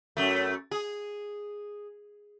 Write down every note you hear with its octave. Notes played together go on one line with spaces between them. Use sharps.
F#2 A3
G#4